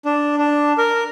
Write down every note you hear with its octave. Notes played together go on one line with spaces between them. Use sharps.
D4
D4
A#4